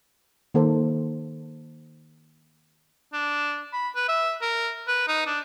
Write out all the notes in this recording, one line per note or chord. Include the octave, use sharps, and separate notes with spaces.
D#3 A#3 A4 C5
D4
B5
B4
E5
A#4
B4
D#4
D4